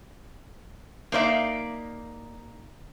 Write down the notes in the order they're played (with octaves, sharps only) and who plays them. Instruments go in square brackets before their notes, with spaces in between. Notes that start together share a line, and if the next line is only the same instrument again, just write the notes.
[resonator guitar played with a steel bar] A#3 D#4 C5 D5 E5 F5